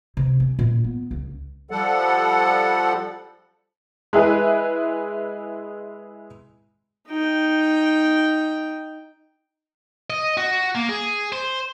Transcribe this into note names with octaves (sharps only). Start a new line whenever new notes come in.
C3
C#4
A#2
B3
C#2
F3 G3 A4 F#5
G#3 E4 G#4 B4
D#4 G5
D#5
F#4
A#3
G#4
C5